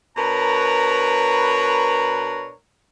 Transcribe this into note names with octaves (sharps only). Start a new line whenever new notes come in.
B2 D4 A#4 B4 C#5 A#5